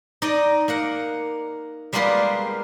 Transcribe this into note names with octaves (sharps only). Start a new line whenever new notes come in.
D#4 D5 D#5
A#3 A#4 F#5
G3 G#3 A#3 B3 F4 G4